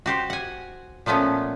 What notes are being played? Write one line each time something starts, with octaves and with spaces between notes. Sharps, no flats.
F#4 G4 C5
F#5 G#5
A#2 F3 A3 B3 C#4